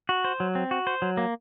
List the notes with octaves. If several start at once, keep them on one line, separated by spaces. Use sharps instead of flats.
F#4
C5
F#3
C4
F#4
C5
F#3
A#3